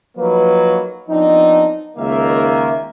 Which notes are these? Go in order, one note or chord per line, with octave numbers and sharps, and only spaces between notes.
F3 F#3 A#3 D#4 B4
F3 B3 C4 D4 D#4
C#2 D#3 A#3 E5